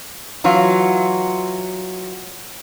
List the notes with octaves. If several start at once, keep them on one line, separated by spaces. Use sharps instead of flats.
E3 F#3 F4